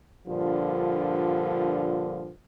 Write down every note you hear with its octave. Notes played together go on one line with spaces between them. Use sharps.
G2 A#2 D3 F3